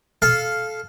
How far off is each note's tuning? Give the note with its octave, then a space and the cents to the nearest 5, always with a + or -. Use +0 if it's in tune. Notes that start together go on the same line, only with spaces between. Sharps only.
A4 -20 F5 +0